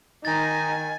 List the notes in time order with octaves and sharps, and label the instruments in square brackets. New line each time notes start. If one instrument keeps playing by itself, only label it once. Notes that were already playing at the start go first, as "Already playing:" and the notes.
[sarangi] D#3 [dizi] D#4 [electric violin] G#5 [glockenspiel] A6